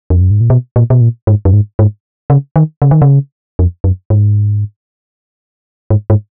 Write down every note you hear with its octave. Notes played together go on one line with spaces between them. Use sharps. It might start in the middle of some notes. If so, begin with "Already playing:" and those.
F2
F#2
G#2
A#2
B2
A#2
B2
A#2
G#2
F#2
G#2
G#2
C#3
D#3
C#3
D#3
C#3
F2
F#2
G#2
G#2
G#2